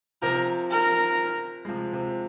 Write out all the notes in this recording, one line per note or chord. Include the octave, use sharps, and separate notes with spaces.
C3 F3 A#4
A#4
G#3
C3 F3
C3 F3